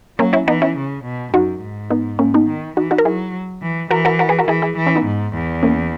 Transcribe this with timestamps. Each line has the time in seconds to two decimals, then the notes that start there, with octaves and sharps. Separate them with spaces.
0.19 F#3 A#3 C#4
0.33 C#4 E4
0.47 E3 B3 D#4
0.62 C#4 E4
0.77 C#3
1.05 B2
1.33 F#2 D#4 F#4
1.62 G#2
1.90 B3 D#4
2.19 A#3 C#4
2.34 B3 D#4
2.49 D#3
2.77 E3 D#4 F#4
2.91 D#4 F#4
2.98 A#4
3.05 F#3 E4 G#4
3.62 E3
3.91 E3 F#4 A#4
4.05 F#4 A#4
4.19 F#4 A#4
4.29 G#4 B4
4.39 F#4 A#4
4.48 E3 E4 G#4
4.62 E4 G#4
4.77 E3
4.87 C#4 E4
4.96 B3 D#4
5.05 G#2
5.34 E2
5.63 A#3 C#4